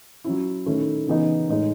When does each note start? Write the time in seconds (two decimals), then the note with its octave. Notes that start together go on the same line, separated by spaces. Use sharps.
0.24 F#3 C#4 E4
0.66 D#3 A3 C#4 E4
1.07 C#3 E3 B3 D#4
1.49 A2 G#3 D#4